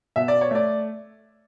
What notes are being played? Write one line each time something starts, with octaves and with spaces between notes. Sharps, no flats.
B2 E5
D5
C#5
A3 D5